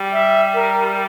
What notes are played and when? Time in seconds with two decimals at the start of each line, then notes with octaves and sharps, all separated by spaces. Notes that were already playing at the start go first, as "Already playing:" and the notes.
Already playing: G3
0.12 E5
0.54 A#4